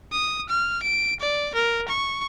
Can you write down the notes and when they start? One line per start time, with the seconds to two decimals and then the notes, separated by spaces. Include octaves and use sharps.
0.12 D#6
0.49 F6
0.83 D7
1.20 D5
1.55 A#4
1.88 C#6